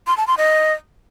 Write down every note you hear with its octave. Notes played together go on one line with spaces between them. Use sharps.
C6
A5
C6
D#5